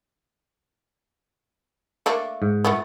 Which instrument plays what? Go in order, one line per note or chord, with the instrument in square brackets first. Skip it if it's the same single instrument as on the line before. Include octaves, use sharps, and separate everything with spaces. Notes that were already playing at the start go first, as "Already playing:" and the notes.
[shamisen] A3 A#3 D4
[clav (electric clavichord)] G#2
[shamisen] F3 A3 B3